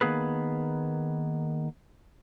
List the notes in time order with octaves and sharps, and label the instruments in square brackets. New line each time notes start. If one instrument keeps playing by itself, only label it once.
[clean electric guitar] D#3 A#3 B3 G#4 B4